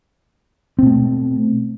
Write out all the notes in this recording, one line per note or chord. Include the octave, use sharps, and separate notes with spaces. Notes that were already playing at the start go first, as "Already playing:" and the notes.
B2 A3 C4